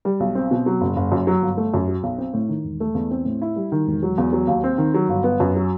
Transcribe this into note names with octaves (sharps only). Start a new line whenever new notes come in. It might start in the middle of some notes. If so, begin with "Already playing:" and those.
G3
B1
C4
B2
F#3
F#1
F#1
F#2
F#3
G1
A3
F#2
F#3
B1
C4
A2
D#3
E1
A3
E2
C4
A2
E4
G3
D#3
E1
F#3
E2
F#3
D#2
C4
D#3
F#3
G1
B3
F#2
F#3